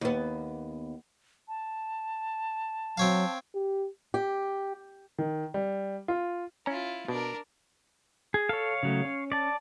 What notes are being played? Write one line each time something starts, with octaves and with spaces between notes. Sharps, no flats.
D#2 B3
A5
F#3 C4 C#5 F5
G4
G4
D#3
G3
F4
C#4 E4 F4 A#5
B2 D4 A#4
G#4
A4 C#5 F5
C#3 F#3 A3
C#4
D5 A5